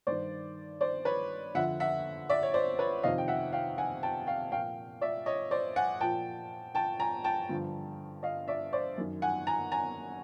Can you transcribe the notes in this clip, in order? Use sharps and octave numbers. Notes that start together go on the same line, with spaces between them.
G2 D#3 C5 D5
C5 D5
B4 C#5
F2 D3 F3 E5 F#5
E5 F#5
D5 E5
C#5
C5 D5
B4 C#5
F2 C3 D#3 D#5 F5
G5
E5 F#5
F5 G5
F#5 G#5
G5 A5
F5 G5
A#2 F3 F5 G5
D5 E5
C#5 D#5
C5 D5
F#5 G#5
A#2 F3 G5 A5
G5 A5
G#5 A#5
G5 A5
G2 D3 F3
D#5 F5
D5 E5
C5 D5
F#2 D#3
F#5 G#5
G#5 A#5
G#5 A#5